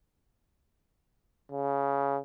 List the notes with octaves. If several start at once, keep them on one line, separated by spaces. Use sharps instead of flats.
C#3